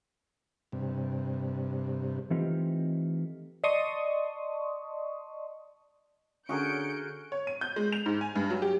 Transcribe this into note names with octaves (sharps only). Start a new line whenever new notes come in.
G2 C3
E3 A3 C4 D#4 F4 G4
D5 D#5 A5 C6 C#6 D#6
D3 C#4 F#4 G#4 A#4 G6 C#7 D7
C#5
D#7
G6
G#3
F7
G#2
G#5
G2
F#3
G4